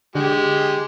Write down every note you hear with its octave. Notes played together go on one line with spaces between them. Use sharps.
D3 G#3 G4